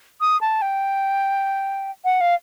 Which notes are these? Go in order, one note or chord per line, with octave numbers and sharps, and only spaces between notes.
D#6
A5
G5
F#5
F5